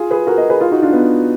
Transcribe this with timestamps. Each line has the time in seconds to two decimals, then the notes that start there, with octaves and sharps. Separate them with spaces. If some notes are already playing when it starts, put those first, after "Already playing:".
Already playing: F4 G#4
0.11 G#4 B4
0.27 F#4 A#4
0.38 B4 D#5
0.49 G#4 B4
0.60 F4 G#4
0.71 D#4 F#4
0.82 D4 F4
0.93 B3